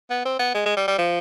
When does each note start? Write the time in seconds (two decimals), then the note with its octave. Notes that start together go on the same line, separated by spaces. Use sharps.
0.10 B3
0.25 C4
0.39 B3
0.54 G#3
0.65 G#3
0.77 G3
0.88 G3
0.98 F3